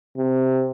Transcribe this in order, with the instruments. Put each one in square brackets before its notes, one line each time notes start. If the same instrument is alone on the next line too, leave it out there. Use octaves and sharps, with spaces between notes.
[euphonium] C3